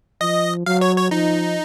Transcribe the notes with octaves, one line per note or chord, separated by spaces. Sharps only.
F3 D#5
F#3 F5
C#5
C#5
F3 D#4